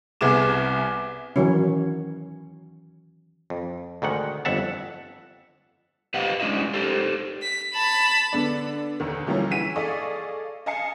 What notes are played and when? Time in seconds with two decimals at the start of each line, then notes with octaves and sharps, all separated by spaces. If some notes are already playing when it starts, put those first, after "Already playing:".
0.21 C2 B3 G#4 D6 E7
1.36 D#3 E3 F#3 C#4
3.50 F2
4.02 D2 G#2 D#3 F#5
4.45 G1 F2 E5 F#5 A5
6.14 G4 B4 C5 D#5 F5 F#5
6.40 G#3 C#4 D4 E4 D#5 E5
6.74 G4 A4 C5
7.42 B6
7.73 A5 B5
8.32 D3 B3 D4
9.00 D#2 D3 D#3
9.26 D3 E3 F3 G3 A#3 C#4
9.51 E3 F#5 B6 D#7 E7
9.76 G#4 A4 D5 D#5 F5 C#6
10.66 D#5 F5 G#5 A5 C7 C#7